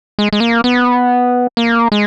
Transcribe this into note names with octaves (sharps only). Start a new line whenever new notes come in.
G#3
G#3
A#3
B3
A#3
G#3